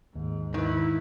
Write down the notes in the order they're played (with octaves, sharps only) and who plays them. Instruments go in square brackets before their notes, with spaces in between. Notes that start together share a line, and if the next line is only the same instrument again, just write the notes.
[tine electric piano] D#2 [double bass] G#2
[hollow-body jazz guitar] D#3 B4 [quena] E4